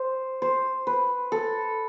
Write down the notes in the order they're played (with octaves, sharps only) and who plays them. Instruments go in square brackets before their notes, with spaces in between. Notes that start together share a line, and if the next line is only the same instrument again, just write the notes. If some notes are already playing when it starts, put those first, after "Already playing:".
Already playing: [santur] C5
C5
B4
A4